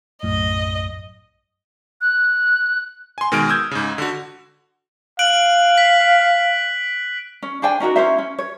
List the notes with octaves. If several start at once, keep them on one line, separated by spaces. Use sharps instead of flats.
B1 F#2 A2 D#5
F#6
G#5 C6
B2 D#3 G#3 G#5 F6 D7
D#6 E6 G6 G#6
G#2 C#3
D3 F#4
F5 F#6 D7 F#7
B6
C#4
D4 C5 G5 G#5
C#4 D#4 F#4 A#4
C#4 E4 C5 E5
C#4
C#5